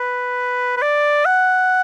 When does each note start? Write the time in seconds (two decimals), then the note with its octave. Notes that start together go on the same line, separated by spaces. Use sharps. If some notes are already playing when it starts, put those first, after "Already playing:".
Already playing: B4
0.77 B4
0.82 D5
1.26 F#5